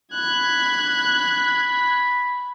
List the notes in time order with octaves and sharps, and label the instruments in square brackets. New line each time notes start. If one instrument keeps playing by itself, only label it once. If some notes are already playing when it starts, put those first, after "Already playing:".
[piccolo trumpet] B5 [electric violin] F#6 G#6